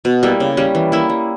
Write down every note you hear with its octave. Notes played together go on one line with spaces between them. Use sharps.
B2
G3 A#3 E4
C#3
G3 C#4
E3
A#3 E4
G3